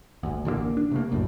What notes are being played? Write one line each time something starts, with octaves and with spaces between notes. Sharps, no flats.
G1 D2
A1 D3 E3 A#3
D4
C3 A3 A#3
A#1 F#2 A2